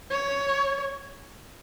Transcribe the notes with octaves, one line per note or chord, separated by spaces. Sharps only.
C#5